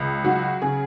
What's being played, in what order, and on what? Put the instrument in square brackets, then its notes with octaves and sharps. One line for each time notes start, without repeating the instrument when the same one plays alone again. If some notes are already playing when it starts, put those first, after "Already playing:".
Already playing: [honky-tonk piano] C#2
F#3 F#4
C#3 G#4